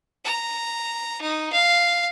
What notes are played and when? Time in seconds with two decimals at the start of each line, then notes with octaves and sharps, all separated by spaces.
0.25 A#5
1.21 D#4
1.53 F5